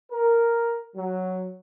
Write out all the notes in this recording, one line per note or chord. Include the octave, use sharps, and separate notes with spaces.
A#4
F#3